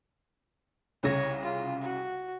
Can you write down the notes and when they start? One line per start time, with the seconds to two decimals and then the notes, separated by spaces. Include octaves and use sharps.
1.03 C2 C#3 C#5 A#6
1.43 F4
1.82 F#4